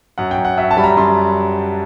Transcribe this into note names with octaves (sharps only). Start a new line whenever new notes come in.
F#2 F#5
G5
F#2
F#5
F#2 E5
A5
G3 B5
A#5
F#2 C6